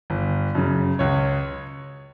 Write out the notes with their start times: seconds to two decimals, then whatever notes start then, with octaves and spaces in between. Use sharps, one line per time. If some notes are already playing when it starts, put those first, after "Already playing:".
0.10 G1
0.55 F#2 C#3
0.99 C#2 C#5